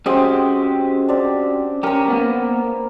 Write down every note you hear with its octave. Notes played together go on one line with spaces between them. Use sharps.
G#3 C4 C#4 F#4 G4 D#6
C4 D4
C#4 G4 A#4 A#5
A#3 B3